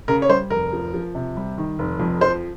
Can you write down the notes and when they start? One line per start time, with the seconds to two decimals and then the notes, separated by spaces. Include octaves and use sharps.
0.08 C#3 A#4
0.22 C#5
0.29 G3 C5
0.50 F1 A#4
0.73 F3
0.94 F3
1.15 C3
1.37 G3
1.58 D#3
1.79 F1
2.00 F2
2.21 F3 C5